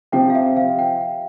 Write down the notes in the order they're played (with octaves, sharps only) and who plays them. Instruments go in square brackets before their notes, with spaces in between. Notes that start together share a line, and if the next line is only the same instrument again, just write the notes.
[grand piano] C3 F3 C4 G4 [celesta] G5
[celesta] F5
E5
F5
G5